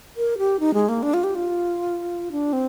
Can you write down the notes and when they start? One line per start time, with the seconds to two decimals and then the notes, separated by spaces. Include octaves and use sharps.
0.17 A#4
0.38 G4
0.60 D#4
0.74 G#3
0.89 A#3
1.03 D4
1.14 F4
1.24 G4
1.35 F4
2.32 D4
2.53 C4